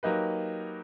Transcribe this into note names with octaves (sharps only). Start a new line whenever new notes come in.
F#3 A#3 D#4 G4 B4